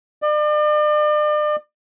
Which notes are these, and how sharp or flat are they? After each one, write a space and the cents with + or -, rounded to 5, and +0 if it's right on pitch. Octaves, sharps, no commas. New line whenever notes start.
D5 +40